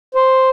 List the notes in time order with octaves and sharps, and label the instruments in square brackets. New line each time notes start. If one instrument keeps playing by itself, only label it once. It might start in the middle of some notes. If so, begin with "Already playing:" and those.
[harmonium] C5